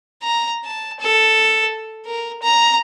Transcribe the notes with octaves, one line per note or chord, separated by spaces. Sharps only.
A#5
A5
A4
A#4
A#5